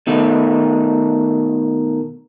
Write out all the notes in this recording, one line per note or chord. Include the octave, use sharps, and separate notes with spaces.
B2 D#3 A3